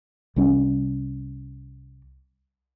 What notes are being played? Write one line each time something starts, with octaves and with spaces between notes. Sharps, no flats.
C2 G3 C#4